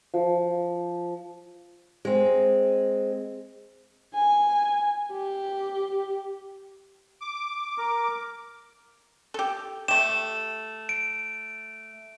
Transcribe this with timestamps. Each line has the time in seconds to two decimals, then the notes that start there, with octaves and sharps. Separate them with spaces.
0.14 F3
2.05 G#3 C4
4.15 G#5
5.12 G4
7.21 D6
7.78 A#4
9.34 G4 A4
9.88 A3 G4 E7
10.89 D7